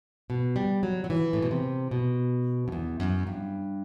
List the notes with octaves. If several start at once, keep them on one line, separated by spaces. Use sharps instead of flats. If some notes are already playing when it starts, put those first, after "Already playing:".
B2
G3
F#3
F#3
E3
A2
B2
C3
B2
F#2
E2
F#2
G2